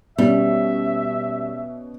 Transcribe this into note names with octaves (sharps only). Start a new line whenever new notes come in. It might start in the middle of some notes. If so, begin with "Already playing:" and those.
B2 G3 C#4 E5